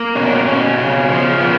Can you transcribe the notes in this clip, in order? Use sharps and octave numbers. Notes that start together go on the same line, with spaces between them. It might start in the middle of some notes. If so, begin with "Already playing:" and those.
Already playing: A#3
B2 C#4
D4
C#4
B2 C#4
C#3
F3
A#3 B3